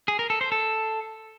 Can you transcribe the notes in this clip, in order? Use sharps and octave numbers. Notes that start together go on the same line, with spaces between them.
G#4
A#4
A4
C5
A4